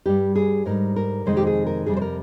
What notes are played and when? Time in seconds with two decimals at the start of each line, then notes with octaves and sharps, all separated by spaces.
0.06 G2 G3 G4
0.36 G#4
0.66 G#2 G3 A#4
0.96 A#4
1.26 F2 C3 D#3 G#3 C5
1.37 G4
1.47 G#4
1.67 A#4
1.86 F2 C3 G3 G#4
1.97 C5
2.02 A#4